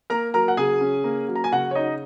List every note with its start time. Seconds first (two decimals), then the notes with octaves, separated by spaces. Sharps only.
0.10 A#3 A#4 A#5
0.34 F#3 A#4 A#5
0.48 F#5
0.57 C#3 G#4 G#5
0.81 C#4
1.04 A#3
1.28 F#3
1.36 A#5
1.44 G#5
1.52 C#3 F#4 F#5
1.71 C#5
1.75 C#4 D#4 D#5